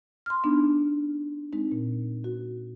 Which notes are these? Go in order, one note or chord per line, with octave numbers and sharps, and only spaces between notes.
C6 F6
B3 D4 D#4
G#3 C4 D#4
A#2
F#4